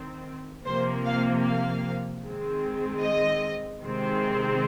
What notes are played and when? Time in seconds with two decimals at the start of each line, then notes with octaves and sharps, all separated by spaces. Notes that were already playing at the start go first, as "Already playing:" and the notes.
Already playing: D#3 C4
0.65 C3 F3 A#3 C5
1.05 F5
1.44 F5
2.22 D#3 G#3 C4
3.01 D#5
3.80 C3 D#3 G#3 C4